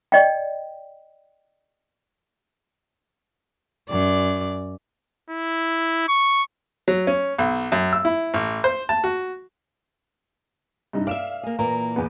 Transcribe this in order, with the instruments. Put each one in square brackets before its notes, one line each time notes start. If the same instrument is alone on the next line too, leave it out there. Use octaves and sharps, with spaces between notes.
[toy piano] D5 D#5 G5
[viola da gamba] F#2 D5
[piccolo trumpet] E4
C#6
[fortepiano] F#3
C#4
B1
F#2
E6
E4
A1
C5
A5
F#4
[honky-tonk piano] G2 C3 D#4
[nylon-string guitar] D5 E5 [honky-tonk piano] F5 E7
[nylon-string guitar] A#3 G#4
[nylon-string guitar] A#2 E3 A#3 [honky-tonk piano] A#5
[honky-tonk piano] E2 B3